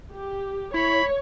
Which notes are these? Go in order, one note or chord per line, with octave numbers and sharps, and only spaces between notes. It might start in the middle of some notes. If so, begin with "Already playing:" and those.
G4
E4 C#5 B5